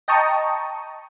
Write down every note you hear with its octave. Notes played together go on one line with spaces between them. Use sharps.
D#5 G5 A5 A#5 C#6 D#6